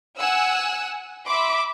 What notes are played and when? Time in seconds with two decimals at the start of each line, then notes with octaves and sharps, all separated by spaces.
0.17 F#5 G#5 E6 F#6
1.27 E5 B5 C6 D6